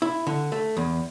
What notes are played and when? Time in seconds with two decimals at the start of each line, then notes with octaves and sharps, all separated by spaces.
0.02 E4
0.27 D3
0.52 A3
0.77 E2